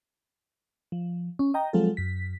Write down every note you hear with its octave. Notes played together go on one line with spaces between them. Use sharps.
F3
C#4
D#5 G5 A#5
F3 F#3 G#3 C4 F4 A4
F#2 B6